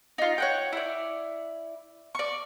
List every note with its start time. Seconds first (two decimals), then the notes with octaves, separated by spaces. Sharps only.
0.18 D#4 F4
0.38 C#5 F#5 G5
0.73 E4 D5
2.15 D5 C#6